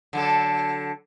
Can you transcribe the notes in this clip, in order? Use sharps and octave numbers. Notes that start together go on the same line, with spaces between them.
D3 F#3 A4